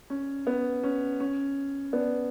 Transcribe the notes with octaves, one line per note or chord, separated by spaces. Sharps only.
C#4
B3
C#4
C#4
B3 D4